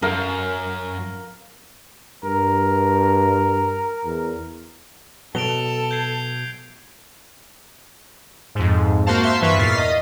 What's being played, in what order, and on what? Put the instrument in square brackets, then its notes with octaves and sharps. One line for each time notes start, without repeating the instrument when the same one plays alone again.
[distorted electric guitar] F#2 [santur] A#4 F5
[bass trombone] G2 [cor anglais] A#4
[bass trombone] E2
[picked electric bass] B2 F#3 [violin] A4 [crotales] D7 F7 G7
[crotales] G6 G#6 C7
[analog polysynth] F2 G#2
A#3 F#4 C5 F5 A5
E5 F5 A5 C6
G2 E3 B4 E5 C#6 B6
E2 A#2 F6 A6 B6 C7
D#5